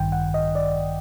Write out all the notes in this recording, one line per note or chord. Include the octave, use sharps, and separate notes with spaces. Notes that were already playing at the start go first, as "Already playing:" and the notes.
Already playing: A1 G2 D#3 G5
F#5
D#5
D5